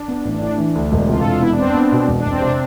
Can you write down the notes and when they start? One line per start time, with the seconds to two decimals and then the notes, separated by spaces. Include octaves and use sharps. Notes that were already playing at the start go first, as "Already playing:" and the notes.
Already playing: D4
0.08 B3
0.25 A1
0.41 A2 D4
0.58 E3
0.75 D2
0.92 E1
1.09 C3 F4
1.19 A4
1.25 E1
1.30 F4
1.41 B3 E4
1.51 D4
1.58 B3 C4
1.70 B3 D4
1.92 B2
2.08 E1
2.19 D4
2.25 E1
2.31 C4
2.41 C3 D4